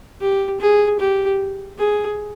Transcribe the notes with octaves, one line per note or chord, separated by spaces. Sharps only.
G4
G#4
G4
G#4